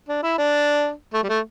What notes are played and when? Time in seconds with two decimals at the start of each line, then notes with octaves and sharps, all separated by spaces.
0.09 D4
0.23 E4
0.38 D4
1.14 A3
1.24 G3
1.29 A3